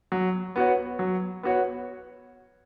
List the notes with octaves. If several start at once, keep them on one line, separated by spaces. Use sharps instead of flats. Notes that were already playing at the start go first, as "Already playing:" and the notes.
F#3
B3 F#4 C#5
F#3
B3 F#4 C#5